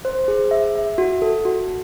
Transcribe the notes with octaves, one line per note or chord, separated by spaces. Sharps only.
C5
G#4
E5
E5
F#4
A4
F#4